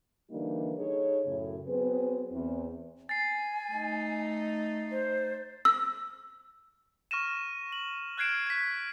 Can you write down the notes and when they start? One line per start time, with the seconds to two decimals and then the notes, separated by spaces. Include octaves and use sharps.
0.30 D3 E3 G3 A#3 D4 D#4
0.76 D#4 G#4 A4 C#5
1.26 F#2 A2 C#3
1.67 F#3 B3 C4 G#4 B4
2.31 E2 C4
3.09 G#5 A6 C7
3.72 A3 D#4
4.91 C5
5.65 E6
7.11 C#6 F6 A#6 D#7 E7
7.72 F#7
8.18 F6 F#6 G#6 C7 D7 E7
8.47 G#6 B6